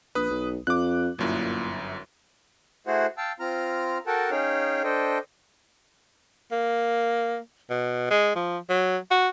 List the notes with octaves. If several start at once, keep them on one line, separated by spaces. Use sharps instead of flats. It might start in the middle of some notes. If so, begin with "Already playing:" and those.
A#1 B4 D#6
B1
F2 D6 F#6
G1 F#2 A#2 E4
A3 E4 F#4 G#4 C5 F#5
F5 G5 A5 E6
C4 F4 A#5 F6
F#4 A4 A#4 F#5 G5 A5
C#4 D#4 G#4 C#5 F5 G5
D4 A4 C5 D#5 G5
A#3
B2
G#3
F3
F#3
F#4